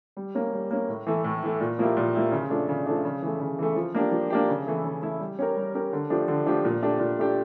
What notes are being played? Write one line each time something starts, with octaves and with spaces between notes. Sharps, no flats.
G3
A#3 C#4
G3
A#3 C#4
A2
E3 A3
A2
E3 A3
A#2
F3 A#3 E4 G4
A#2
F3 A#3 E4 G4
C#3
F3 A3 D4
C#3
F3 A3 D4
C#3
E3 A3
C#3
E3 A3
F3
A#3 D4 G4
F3
A#3 D4 G4
C#3
E3 A3 E4
C#3
E3 A3 E4
G3
C#4 G4 A#4
G3
C#4 G4 A#4
D3
F3 A3 D4 G4
D3
F3 A3 D4 G4
A#2
A3 D4 G4
A#2
A3 D4 G4